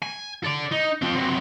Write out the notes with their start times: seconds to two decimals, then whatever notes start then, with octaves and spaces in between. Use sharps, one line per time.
0.02 G#5
0.45 A4 D5
0.72 D#4
1.02 F3 C4
1.15 C3 F#3